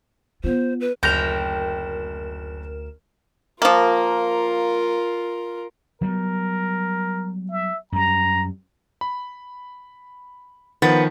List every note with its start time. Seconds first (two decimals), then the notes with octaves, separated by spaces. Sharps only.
0.44 B3 F4 C5
0.80 B4
1.03 F#1 D2 A#4 G5 A#6 E7 F7
3.62 F3 A#3 F4 A#4
6.01 F#3 G3 B3 A#4
7.51 E5
7.92 F#2 G3 A#5
9.01 B5
10.82 D#3 F3 B3 A6